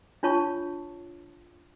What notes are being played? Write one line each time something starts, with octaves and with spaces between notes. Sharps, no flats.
D4 F4 C#5 A5 C#6